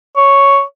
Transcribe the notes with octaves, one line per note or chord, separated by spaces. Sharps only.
C#5